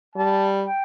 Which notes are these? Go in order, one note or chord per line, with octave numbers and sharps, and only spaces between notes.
G3 A5
G5